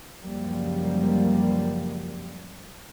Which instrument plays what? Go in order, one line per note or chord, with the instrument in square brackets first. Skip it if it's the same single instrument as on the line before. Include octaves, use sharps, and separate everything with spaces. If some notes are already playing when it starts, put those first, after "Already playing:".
[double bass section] C#2 F#2 F3 G3 A#3